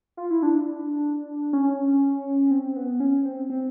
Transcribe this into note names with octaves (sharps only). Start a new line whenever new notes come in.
F4
E4
D4
C#4
C4
B3
C#4
C4
C4